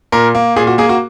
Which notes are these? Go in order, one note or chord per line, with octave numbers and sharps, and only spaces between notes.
A#2 A#4
A#3
A#2 G#4
F#4
A#3 G#4
F#4